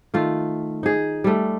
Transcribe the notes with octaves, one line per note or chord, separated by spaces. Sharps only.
D#3 A3 F4
D#4 G#4
G3 A3